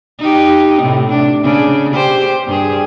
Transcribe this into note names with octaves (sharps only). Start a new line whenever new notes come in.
D#4 G4
A2 C3
D4
C#3 D4
G4 C5
G2 G#4